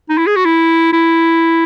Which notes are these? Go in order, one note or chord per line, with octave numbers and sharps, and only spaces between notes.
D#4
E4
G#4
F#4
E4
E4